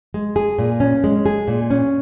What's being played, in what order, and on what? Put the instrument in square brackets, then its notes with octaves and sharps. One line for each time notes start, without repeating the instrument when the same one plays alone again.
[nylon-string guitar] G#3
G#4
A#2
C#4
G#3
G#4
A#2
C#4